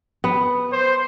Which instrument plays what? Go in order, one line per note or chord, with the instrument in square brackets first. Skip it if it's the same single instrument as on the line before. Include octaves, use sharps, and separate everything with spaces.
[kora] B3
[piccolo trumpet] C5